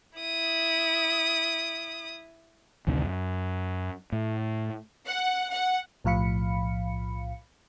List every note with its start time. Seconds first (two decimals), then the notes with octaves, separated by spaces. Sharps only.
0.19 E4 D#6
2.87 A1 D2 C3 D#3
3.04 F#2
4.12 A2
5.06 F#5
5.52 F#5
6.04 B1 A2 F3 F5 B5 C#7